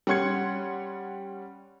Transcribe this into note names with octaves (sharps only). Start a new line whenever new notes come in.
G3 C#4 F#5 C6 G#6 C#7